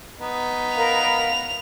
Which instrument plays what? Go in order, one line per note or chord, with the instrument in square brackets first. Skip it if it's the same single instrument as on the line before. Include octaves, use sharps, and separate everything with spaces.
[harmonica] B3 D#4
[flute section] A#4 B5 [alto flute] F5 [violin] F7